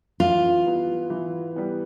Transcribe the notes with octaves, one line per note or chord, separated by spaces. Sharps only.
E3 F4
G3 B3 E4
E3
G3 B3 E4